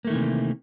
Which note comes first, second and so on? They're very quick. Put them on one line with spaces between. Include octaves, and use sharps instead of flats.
A#3 A3 D#3 E3 C3